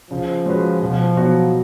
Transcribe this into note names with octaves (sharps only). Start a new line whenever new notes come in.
C#3 F3
G#3 C#4 F#4 B4
B2 F3
F#3 B3 D#4 F#4